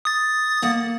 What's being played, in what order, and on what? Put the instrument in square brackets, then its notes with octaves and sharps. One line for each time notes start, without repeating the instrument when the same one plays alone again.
[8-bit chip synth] D#6 A6
[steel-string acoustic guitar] A#3 F#5